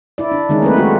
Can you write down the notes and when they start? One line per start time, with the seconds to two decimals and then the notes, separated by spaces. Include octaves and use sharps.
0.18 E4 D5
0.32 D4
0.49 D#3 G#3 C#4 D#4
0.62 F#3 A3 A#3 C4 E4 B4
0.77 G#3 A3 F4 F#4